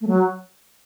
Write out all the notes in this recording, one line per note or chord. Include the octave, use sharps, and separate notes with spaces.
A3
F#3